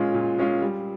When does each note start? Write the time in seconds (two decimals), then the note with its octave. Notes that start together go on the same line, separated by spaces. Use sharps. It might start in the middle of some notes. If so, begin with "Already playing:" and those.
Already playing: A#2 G#3 C#4 F4
0.14 A#2
0.38 G#3 C#4 F4
0.62 G3